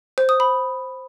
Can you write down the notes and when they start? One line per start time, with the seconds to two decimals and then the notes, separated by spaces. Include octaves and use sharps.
0.18 C5
0.29 D#6
0.40 B5